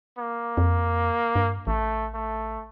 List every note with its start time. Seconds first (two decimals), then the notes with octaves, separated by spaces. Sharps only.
0.18 A#3
0.57 F2
1.35 G2
1.67 A1 A3
2.14 A3